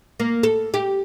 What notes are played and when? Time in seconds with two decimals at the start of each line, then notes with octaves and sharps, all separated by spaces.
0.20 A#3
0.43 A4
0.74 G4